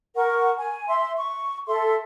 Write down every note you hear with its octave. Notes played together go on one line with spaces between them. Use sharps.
A#4 F#5 C#6
G#5
E5 C6
C#6
A4 E5 C6